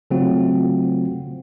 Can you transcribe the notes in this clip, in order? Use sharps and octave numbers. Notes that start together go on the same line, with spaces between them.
C#3 F#3 A3 C4 F4 F#4